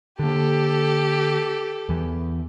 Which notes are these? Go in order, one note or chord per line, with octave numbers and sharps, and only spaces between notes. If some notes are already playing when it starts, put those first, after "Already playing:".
D3 A#3 G4 A4
E2 E3